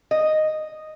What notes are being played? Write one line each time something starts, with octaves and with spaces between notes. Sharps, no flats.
D#5